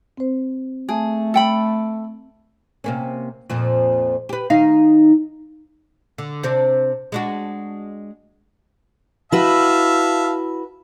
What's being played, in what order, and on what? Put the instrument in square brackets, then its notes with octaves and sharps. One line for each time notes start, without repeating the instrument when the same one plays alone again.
[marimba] C4 C5
[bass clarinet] A3 [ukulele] G#4 [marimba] A5
[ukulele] A4 G5 B5
[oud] C3 A#3 C#4
F2 A#2 F3
G4 B4
D#3 D#4 F5
D3
C3 C4 D4
G#3 D4 F#4
[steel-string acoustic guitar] E4 F#4 B4 [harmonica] E5 F5 A5